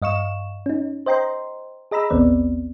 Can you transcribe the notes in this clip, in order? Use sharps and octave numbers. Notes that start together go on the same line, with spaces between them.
G2 D#5 F5 C#6 E7
C#4 D#4
C5 D#5 G5 A#5 C6
G#4 D#5 A#5 B5 E6
A1 D#2 B3 C4 D5